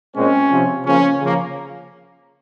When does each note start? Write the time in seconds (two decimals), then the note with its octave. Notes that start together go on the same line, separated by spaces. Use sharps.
0.16 A#2 G#3 C4 C#4
0.51 C3 F3 C4
0.86 C#3 F3 A#3 C#4
1.20 C#3 F3 A#3